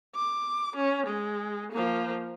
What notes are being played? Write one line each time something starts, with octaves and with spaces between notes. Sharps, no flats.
D6
C#4
G#3
F3 A#3